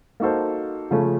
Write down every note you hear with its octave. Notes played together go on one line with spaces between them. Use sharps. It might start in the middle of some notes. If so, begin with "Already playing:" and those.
A#3 D#4 F#4 A4 C5
C#3 F3 A3 C#4